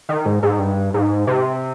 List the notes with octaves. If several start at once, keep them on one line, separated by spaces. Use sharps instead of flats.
D#3
G#2
G#2
G2
G#2
C3